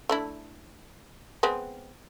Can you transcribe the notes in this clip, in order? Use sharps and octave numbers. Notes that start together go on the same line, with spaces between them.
A3 D4 E4
G#3 B3 C4